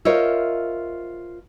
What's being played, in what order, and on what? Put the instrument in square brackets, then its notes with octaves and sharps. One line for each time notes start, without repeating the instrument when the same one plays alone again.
[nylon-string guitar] F4 A#4 C5 C#5 D#5 E5